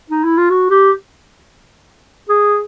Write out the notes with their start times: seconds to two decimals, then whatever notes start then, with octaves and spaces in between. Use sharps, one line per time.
0.10 D#4
0.23 E4
0.37 F4
0.50 F#4
0.70 G4
2.29 G#4